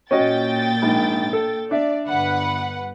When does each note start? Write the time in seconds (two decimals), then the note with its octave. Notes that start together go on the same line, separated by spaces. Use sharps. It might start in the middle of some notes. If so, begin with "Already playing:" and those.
0.11 A#2 C#4 F#4 D#5 G5 A6
0.82 A#1 G#2
1.33 A4
1.71 D4 D5 E5
2.06 G1 B4 F#5